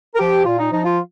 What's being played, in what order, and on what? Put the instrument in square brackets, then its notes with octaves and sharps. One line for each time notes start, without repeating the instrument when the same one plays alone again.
[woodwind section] A#4
F3 G4
A#2 F4
D#4
F3 D#4
F4